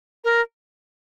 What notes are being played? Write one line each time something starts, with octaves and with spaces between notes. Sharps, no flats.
A#4